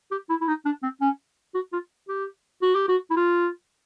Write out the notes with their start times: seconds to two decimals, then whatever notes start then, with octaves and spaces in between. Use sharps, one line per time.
0.11 G4
0.29 E4
0.41 E4
0.48 D#4
0.65 D4
0.83 C4
1.01 C#4
1.54 F#4
1.72 F4
2.09 G4
2.62 F#4
2.75 G4
2.88 F#4
3.10 E4
3.16 F4